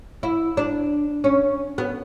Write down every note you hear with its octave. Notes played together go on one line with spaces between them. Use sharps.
E4
D4
C#4
B3